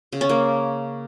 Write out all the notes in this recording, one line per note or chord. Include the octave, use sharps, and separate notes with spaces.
C#3
C#4
A#3